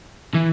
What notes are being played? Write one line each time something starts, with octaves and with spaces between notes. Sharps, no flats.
E3